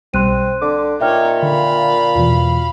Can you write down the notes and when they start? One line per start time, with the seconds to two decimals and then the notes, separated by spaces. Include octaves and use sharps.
0.14 B1 B2 G3 C4 C6 F#6 D#7
0.61 D3 D6
1.01 A#2 D#4 C#5 E5 G5 F6
1.43 D3 F5 B5
2.15 E2 B2 E3 F4